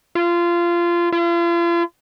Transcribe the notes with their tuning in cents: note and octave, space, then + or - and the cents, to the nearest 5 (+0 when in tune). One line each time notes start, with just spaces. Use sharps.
F4 -20
F4 -40